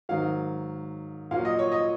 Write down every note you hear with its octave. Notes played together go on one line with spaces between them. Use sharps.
G#2 D#3 F#3 F5
A#2 F#3 F5
D#5
C#5
D#5